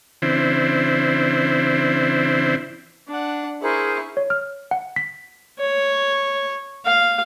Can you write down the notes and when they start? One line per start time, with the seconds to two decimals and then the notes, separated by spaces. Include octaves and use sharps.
0.22 C#3 E3 C4 D4 E4 C5
3.08 D4 F#5
3.62 E4 G#4 A#4 C5 C#6
4.17 C#5
4.30 F6
4.71 F#5
4.96 B6
5.59 C#5
6.86 F5